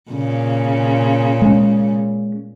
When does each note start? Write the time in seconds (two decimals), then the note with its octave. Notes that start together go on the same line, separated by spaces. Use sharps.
0.11 A#2 C#3
1.42 G#3 C#4